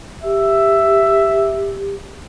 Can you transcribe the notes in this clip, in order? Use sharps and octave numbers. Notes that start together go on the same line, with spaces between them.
G4 E5